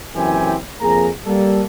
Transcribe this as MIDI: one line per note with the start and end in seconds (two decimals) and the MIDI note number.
0.16 0.56 30
0.16 0.56 42
0.16 0.56 52
0.16 0.56 60
0.16 0.56 67
0.16 0.56 80
0.81 1.09 41
0.81 1.09 58
0.81 1.09 68
0.81 1.09 82
1.26 1.63 55
1.26 1.63 58
1.26 1.63 69